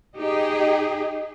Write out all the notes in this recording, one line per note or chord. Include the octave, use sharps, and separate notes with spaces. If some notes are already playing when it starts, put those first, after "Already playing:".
D#4 G4 G#4 D#5